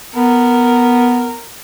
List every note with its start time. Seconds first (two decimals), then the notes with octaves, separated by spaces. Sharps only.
0.16 B3 A#4